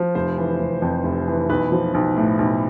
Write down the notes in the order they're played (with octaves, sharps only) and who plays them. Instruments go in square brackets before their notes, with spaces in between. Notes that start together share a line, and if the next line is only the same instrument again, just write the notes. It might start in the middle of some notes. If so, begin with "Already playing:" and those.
Already playing: [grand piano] F3
F1 C5
E3
F1
F2
F1
E3
B1 B4
F3
B1
A2
B1